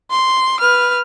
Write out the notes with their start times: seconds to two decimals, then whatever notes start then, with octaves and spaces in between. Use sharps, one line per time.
0.11 C6
0.60 B4 F6